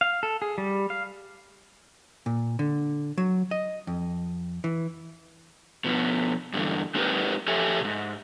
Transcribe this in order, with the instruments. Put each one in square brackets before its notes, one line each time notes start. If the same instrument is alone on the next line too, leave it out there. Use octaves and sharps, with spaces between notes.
[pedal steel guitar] F5
A4
G#4
G3
F5
[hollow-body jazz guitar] A#2
D3
F#3
D#5
F2
E3
[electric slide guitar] B2 F3 B3
G2 D3 E3
G#3 C4 D#4 G4 A#4 B4
F2 G4 A4 C#5 E5 G#5
G#2 B2